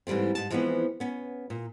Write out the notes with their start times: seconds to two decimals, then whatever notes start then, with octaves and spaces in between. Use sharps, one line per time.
0.07 G#2 E3 G3 A3 C4
0.35 G#2 A5
0.50 E3 F3 G#3 B3 C4
1.00 B3 C#4
1.50 A#2